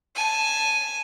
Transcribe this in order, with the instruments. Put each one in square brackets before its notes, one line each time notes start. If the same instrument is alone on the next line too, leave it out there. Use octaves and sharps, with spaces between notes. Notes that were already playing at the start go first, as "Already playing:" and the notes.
[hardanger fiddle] G#5 A5